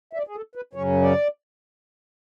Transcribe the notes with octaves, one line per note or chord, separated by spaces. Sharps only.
E5
D5
G#4
A4
B4
F#2 C#3 F#3 C#4 C#5
D5